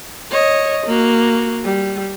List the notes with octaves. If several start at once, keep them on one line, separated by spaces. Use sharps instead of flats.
C#5 D#5
A#3 F#4
G3